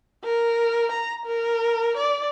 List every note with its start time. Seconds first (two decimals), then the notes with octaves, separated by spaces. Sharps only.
0.24 A#4
0.92 A#5
1.25 A#4
1.97 D5